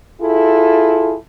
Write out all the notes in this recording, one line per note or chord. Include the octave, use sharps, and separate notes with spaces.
E4 F4 G#4 A4